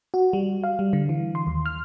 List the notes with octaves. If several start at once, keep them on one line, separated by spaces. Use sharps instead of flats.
F#4
G3
F5
G3
D3
E3
C6
D#2
F6